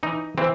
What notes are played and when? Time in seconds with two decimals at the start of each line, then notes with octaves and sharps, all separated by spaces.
0.03 E3 D#4
0.38 E3 C4